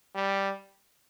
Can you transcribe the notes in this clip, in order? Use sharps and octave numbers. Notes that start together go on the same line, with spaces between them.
G3